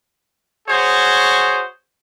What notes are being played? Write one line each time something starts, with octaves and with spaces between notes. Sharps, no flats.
F#4 G#4 C5 C#5